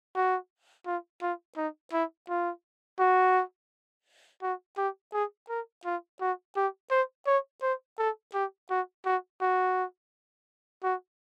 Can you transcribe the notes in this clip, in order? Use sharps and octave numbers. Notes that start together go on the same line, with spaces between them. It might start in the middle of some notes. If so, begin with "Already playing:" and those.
F#4
F4
F4
D#4
E4
F4
F#4
F#4
G4
G#4
A#4
F4
F#4
G4
C5
C#5
C5
A4
G4
F#4
F#4
F#4
F#4